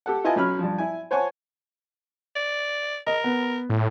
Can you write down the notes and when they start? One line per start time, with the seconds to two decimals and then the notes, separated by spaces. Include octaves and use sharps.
0.06 G4 A4 F#5
0.24 E4 F4 B4 D#5 G#5 A5
0.36 B1 F#3 C#4 B5 F6
0.59 G2 F3
0.78 E4 G#5
1.11 C5 C#5 F#5 G#5 A5 C#6
2.36 D5
3.07 A#4 D#5
3.24 B3
3.70 A2